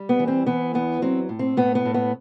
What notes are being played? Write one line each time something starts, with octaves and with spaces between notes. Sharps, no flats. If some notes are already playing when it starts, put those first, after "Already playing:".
Already playing: G3
B3
E3
C4
E3 B3
E2 B3
F#3 C4
A2
C4
A2 B3
B3
A2
B3